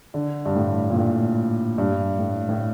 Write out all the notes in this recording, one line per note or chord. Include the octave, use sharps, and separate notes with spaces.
D3
G2
A2
A#2
A2
G2
A2
A2